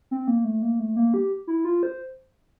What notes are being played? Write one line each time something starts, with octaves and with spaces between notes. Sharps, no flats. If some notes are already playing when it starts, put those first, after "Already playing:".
C4
A#3
A3
A#3
A3
A#3
G4
E4
F4
C5